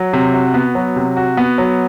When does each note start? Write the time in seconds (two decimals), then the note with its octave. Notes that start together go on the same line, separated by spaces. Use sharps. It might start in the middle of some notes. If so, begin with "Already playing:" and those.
Already playing: F#3
0.13 C3
0.34 F#4
0.54 B3
0.75 F#3
0.96 C3
1.17 F#4
1.37 B3
1.58 F#3